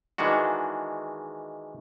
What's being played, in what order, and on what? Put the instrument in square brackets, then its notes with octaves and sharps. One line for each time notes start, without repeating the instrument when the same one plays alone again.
[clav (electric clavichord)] D#3 E3 G#3 D4 F#4